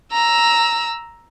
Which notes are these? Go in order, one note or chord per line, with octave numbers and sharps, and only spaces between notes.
A#5 E6